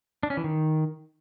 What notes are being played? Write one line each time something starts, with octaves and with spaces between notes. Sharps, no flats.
D4
C#4
E3
D#3